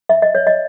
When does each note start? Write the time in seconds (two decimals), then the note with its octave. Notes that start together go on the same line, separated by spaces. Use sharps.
0.09 E5
0.22 D#5
0.35 C#5
0.47 D#5